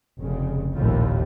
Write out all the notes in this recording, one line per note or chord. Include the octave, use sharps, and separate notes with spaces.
F1 C#3
F1 A#1 D#2 A2 F3